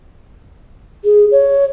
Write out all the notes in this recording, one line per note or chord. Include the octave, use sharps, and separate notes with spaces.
G#4
C#5